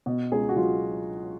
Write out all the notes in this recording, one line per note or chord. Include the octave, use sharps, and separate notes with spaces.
B2
C#2 G#4
F#4
F#3 F4